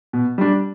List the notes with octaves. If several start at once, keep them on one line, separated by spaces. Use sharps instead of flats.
B2
G3 D4